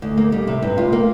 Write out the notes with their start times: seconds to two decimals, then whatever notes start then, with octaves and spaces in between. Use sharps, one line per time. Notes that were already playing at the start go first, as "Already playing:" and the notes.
0.02 D2
0.17 A#3
0.32 G3
0.47 C3
0.62 G2
0.78 F4
0.93 A#3